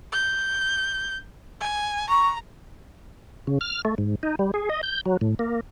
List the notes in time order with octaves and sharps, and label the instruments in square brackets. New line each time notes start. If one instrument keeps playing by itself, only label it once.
[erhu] G6
G#5
[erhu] A#5 [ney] C#6
[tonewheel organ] C#3
F6
A3
G#2
D#4
G3
G#4
D#5
G6
F#3
A2
A#3